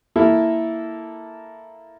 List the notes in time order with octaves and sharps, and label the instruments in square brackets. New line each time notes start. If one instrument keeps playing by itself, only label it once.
[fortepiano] A#3 E4 A4 A#4 E5